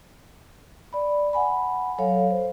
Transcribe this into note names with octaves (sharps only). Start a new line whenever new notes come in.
D5 B5
F#5 G#5 B5
F#3 A4 C#5 F5
C5